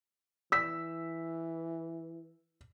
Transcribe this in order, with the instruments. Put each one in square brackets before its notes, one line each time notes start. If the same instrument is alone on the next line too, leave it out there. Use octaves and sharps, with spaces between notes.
[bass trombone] E3 [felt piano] E6 B6